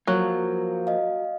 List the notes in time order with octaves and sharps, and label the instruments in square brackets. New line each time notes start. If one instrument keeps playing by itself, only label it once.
[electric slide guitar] F3 A#3 [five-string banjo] F#3
[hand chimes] D#5 F5